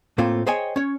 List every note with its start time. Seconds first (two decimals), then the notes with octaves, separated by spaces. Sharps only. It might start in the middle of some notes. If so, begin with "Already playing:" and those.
0.18 A2 A3 A#3 C4 F4
0.47 G#4 C5 C#5 D#5 G5 G#5
0.76 C#4 C#5